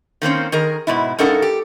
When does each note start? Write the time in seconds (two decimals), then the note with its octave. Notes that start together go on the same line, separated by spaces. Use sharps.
0.22 D#3 A#3 C4 C#4
0.52 D#3 G#4 A#4
0.87 G#2 B2 E4
1.19 G2 C#4 D#4 A4 A#4 F#5
1.42 G4